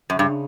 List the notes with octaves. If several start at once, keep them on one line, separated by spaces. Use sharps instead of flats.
F#2 C#3
G2